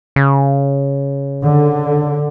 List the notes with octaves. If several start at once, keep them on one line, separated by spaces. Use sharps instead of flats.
C#3
D3